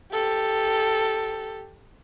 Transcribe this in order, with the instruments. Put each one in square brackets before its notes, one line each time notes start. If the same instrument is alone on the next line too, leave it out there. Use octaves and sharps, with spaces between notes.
[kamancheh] G4 A4